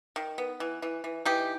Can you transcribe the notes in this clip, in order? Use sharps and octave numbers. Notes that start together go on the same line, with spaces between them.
D#3
B3
E3
E3
E3
E3 D#4 G4